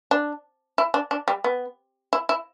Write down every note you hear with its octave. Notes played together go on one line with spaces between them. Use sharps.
D4
E4
D4
D4
G3
B3
E4
E4